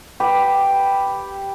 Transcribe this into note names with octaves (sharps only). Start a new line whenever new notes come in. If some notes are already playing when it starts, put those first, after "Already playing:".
G4 B4